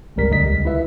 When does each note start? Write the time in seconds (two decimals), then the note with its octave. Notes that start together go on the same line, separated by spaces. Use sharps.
0.16 G#1 C#2 C3 G3 A#4 B6
0.30 D#2 D3 G3 D#5 B6
0.43 C#2
0.65 E4 F4 B4 E5